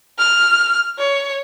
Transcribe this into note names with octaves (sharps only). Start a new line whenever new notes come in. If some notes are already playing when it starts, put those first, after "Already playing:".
F6
C#5